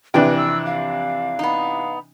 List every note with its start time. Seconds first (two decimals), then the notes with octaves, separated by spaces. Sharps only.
0.14 F2 C3 E3 D4 B4 G5
0.37 E6
0.66 F5
1.39 B3 D#4